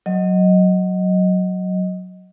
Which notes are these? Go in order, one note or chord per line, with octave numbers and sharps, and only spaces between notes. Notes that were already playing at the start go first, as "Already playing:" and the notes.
F#3 D#5